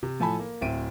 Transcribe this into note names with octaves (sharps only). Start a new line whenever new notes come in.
C3
A2 F3 A4 G#5 A5 B5
A#3
D1 C4 E5 D7 D#7